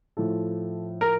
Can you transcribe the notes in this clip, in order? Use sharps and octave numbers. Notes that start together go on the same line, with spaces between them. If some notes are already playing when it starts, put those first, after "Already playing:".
A2 F3 A4
A#4